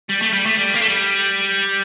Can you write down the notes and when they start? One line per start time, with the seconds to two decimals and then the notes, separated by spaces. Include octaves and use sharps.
0.09 G3
0.22 A3
0.33 G3
0.46 A3
0.58 G3
0.75 A#3
0.81 A3
0.88 G3